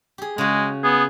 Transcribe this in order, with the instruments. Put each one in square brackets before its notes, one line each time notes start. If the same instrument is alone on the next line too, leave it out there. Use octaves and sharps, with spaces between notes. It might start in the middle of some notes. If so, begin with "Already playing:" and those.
[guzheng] G4 G#4
[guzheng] C#3 F#4 [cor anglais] G#3
[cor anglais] B3 [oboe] G#4